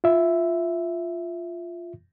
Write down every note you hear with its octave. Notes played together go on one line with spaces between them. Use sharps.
F4 E5